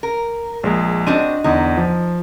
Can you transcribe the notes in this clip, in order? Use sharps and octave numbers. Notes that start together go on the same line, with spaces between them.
A#4
A#1 G#3
C4 D4 F#4 D#5 D#7
E2 D3 D#4
F3